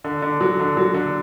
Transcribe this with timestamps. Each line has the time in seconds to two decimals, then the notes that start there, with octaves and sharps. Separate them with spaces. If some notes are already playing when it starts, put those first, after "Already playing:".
0.04 D3
0.22 D3
0.41 F#3
0.59 D3
0.77 F#3
0.94 D3